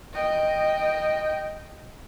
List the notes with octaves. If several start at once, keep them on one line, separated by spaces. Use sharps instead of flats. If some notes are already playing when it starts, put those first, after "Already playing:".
D#5 G5